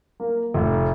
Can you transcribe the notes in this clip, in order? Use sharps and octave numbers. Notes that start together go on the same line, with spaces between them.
A#3
F1